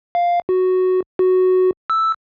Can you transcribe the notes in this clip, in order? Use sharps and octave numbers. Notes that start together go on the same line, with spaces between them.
F5
F#4
F#4
E6